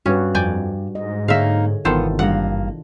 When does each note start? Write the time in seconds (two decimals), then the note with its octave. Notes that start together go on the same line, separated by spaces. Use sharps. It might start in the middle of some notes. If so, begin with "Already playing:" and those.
0.06 G2 C#4 F#4 B4
0.35 F2 D5 G5 G#5
0.95 G#2 D#5
1.28 D3 A#3 D#4 G#4 C#5 E5 F5
1.85 G#1 C3 D#3 E3 B3 F4 A4 C5
2.19 G2 A#3 D4 F#5